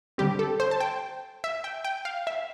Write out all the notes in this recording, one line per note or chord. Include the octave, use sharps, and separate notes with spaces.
D3 G3 C4 G4
A4
C5
A5
G5
E5
G5
G5
F5
E5